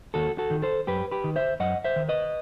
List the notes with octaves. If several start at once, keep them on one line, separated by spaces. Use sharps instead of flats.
D#2 F#4 A4
F#4 A4
D#3
A4 C5
F#2 G4 B4
G4 B4
D#3
C5 E5
F#2 D#5 F#5
C5 E5
D#3
B4 D#5